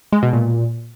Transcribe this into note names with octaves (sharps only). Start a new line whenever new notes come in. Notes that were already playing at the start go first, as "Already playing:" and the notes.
G#3
B2
A#2